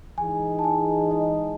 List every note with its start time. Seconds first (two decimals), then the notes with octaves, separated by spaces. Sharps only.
0.18 E3 G#3 D#4 G#4 G#5
0.59 A5
0.64 G#5
1.11 D#5